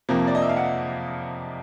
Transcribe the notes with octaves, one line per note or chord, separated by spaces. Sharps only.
F2 C3 F3 A#3
D5
D#5
E5
F5
F#5